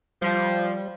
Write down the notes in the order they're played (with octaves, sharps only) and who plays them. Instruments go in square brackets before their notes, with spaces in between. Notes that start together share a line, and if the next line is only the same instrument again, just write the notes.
[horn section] F3 [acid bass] G3